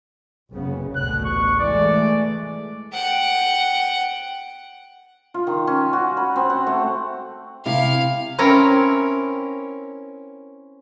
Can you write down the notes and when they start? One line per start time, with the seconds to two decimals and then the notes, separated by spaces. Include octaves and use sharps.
0.54 F#1 C#3 B3
0.96 A1 D2 B2 F#6
1.25 C#6
1.59 E3 G#3 A3 D5
2.93 F#5 G5
5.34 F4
5.47 D#3
5.67 C#4
5.93 F#4
6.17 B5
6.36 C4
6.50 F#5
6.67 A3
7.66 C3 E4 F5
8.38 C4 C#4 E4 A#4 C#5